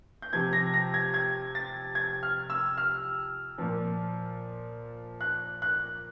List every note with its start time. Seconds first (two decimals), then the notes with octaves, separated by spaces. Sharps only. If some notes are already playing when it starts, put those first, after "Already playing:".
0.22 G6
0.33 C3 F3 G#6
0.53 A#6
0.74 A#6
0.94 G#6
1.14 G#6
1.55 A6
1.95 G#6
2.23 F6
2.50 E6
2.77 F6
3.58 A#2 F3
5.21 F#6
5.62 F#6